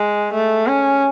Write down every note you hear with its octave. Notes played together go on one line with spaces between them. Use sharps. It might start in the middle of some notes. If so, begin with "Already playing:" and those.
Already playing: G#3
A3
C#4